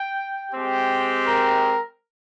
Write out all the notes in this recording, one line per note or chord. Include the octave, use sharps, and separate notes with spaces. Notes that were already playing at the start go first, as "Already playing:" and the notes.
Already playing: G5
G#3 C4 G4
A#4